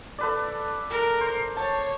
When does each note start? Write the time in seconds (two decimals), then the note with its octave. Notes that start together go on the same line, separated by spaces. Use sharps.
0.18 A4 B4 D5
0.91 A#4
1.21 C5
1.57 C#5 A5